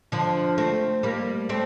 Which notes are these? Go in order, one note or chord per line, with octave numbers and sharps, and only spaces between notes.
D3 F3
A3 C4
G3 A#3
A3 C4